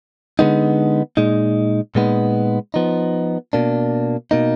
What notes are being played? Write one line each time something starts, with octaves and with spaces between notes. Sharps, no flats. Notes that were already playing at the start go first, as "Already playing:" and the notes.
D3 G#3 B3 D#4
A#2 G#3 D#4
A#2 G#3 B3 D#4
F3 B3 D#4
B2 A#3 D4
B2 A#3 D#4